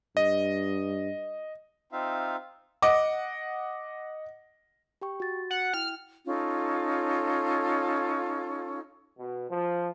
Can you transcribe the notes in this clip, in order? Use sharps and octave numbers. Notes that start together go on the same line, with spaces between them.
G2 D#5
C4 D#4 F4 E5 F5
D#5 F#5 D6
G4 G5 C#6
F#4 A6
F#5
E4 G5 F6
C#4 D#4 F4 A4
B2
F3